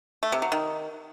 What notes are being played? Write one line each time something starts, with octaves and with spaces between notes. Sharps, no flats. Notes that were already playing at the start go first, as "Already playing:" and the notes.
A3
C3
F#3
D#3